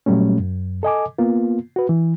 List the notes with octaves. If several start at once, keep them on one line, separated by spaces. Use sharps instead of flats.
A#2 F#3 G3 A3 C#4
F#2
A4 D#5 G#5 D6
A#3 B3 F4
F#4 B4
E3